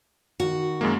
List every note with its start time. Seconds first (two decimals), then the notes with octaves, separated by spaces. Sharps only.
0.40 D#3 F#4
0.81 F#2 G#3 A#3